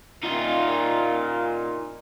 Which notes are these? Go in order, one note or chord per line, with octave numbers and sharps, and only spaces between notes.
A#2 D#4 F4